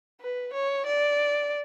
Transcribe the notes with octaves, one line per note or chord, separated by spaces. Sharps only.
B4
C#5
D5